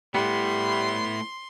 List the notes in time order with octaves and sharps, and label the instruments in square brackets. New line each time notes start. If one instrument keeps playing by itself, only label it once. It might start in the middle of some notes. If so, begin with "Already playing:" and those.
[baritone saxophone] G3 [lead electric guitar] A3 E4 [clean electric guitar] B3 [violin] C6